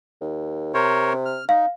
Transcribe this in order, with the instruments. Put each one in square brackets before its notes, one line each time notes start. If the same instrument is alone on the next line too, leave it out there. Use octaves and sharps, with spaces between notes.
[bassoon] D#2
[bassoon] C3 [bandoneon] A#4 C5 C#5
[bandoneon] F6
[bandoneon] D#4 [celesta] F5